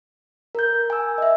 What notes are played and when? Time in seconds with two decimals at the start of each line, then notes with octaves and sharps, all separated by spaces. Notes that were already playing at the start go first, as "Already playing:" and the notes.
0.55 A#4 G6
0.90 G#5 E6
1.18 D#5 E5